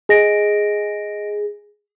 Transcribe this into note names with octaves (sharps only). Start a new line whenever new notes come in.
G#4 D#5 A#6 D7